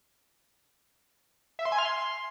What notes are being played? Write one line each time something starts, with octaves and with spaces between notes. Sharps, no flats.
E5
C6
G#5
F6
C6